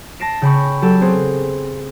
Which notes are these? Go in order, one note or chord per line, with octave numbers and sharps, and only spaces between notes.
A5 A#6 C7 D7 E7
C#3 G5 B5 C#6
F#3 G4 A4 E7
B3 C4 G#4 C5